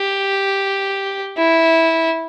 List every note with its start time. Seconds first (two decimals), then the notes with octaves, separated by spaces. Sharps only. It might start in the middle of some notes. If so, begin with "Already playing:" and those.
Already playing: G4
1.37 E4